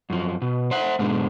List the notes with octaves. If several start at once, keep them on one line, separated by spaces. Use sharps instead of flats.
F#2 F3
B2
C5 E5 F#5
G#2 B2 D3 G#3